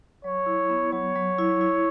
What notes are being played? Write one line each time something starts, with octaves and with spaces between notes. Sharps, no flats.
F#3 C#5
E4
B3
F#3 C#5
F#3
E4
E4